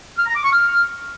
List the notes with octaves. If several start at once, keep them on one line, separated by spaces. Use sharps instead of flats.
F6
A#5
D6
C#6
F6